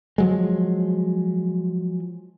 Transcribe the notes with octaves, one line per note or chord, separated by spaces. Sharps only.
F3 F#3 G#3